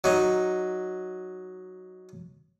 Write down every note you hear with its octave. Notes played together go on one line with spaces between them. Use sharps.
F#3 D#4